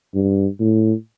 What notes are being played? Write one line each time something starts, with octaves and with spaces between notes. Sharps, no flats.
G2
A2